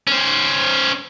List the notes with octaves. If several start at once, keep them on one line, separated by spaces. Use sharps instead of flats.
C#4 C5